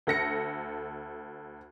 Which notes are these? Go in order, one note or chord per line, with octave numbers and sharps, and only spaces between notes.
D2 A4 A#6 C#7